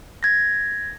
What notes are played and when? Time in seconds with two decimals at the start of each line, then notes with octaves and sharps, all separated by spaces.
0.23 G#6 A#6